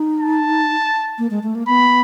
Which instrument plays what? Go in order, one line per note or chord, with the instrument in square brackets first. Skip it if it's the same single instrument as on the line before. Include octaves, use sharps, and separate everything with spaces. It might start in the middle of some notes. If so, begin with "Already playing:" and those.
Already playing: [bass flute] D#4
[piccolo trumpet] A5
[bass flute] A#3
G#3
A3
A#3
[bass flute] B3 [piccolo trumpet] B5